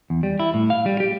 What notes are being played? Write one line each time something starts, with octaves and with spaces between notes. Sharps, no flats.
E2
G3
E4
A2
F5
G3
G4